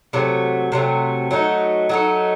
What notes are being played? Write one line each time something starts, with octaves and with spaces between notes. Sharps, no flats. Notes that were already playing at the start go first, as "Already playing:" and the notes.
C3 F#3 A3
C3 F#3 A3
F#3 A3 D#4
F#3 A3 D#4